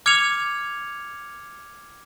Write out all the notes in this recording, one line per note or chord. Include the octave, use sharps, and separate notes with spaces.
D6 F6 G#6 C#7 F7